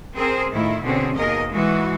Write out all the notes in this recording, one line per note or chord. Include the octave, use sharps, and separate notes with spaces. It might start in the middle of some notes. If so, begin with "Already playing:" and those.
C4 G#4 A#4 C5
A2 D#3 E4 F4
B2 D3 C4 C#4 G#4
D#2 B2 G#4 A#4 D#5
E3 G#3 F#4